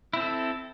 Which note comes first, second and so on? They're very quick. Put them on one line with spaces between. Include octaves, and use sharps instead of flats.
E4 C4 A4